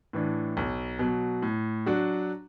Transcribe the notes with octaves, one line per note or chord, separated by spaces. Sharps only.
A2 E3 D4
B1
B2 F#3
A2
F#3 D4 F#4